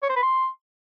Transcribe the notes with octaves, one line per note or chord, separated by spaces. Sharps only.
C#5
C5
B4
C6